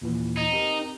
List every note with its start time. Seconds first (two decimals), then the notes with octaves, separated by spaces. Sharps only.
0.01 D#2 A#2 E3
0.37 D#4
0.52 C4 G4 A#4